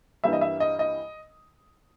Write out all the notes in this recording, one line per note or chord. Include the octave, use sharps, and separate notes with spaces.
G2 E3 G3 A#3 E5
D#5
E5
D#5
D#5